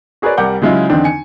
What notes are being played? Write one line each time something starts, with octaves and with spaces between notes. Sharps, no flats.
F#4 G#4 A#4 B4 C#5 D5
C2 G3 A#4 F#5 D6 G6
C#3 F#3 G#3 E4 F4
E2 D3 C4 D4 D#4
G#5 C#7